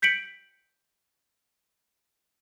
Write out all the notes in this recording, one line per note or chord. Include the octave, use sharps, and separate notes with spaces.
G6 B6 C#7 D7 F#7